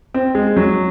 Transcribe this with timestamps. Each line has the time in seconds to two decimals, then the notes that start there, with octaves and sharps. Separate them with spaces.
0.14 C4
0.35 G#3
0.57 F#3